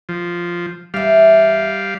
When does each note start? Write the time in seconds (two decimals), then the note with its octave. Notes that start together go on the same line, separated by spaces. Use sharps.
0.09 F3
0.94 E2 G3 E5 F5